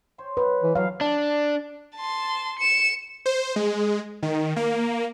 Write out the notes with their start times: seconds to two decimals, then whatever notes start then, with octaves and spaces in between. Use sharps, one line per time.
0.18 C5 C#5 C6
0.37 F#3 D#4 B4
0.63 E3
0.75 D3 F#3 G3 F5
1.01 D4
1.96 A5 C6
2.59 C#7 E7
3.26 C5
3.56 G#3
4.23 D#3
4.56 A#3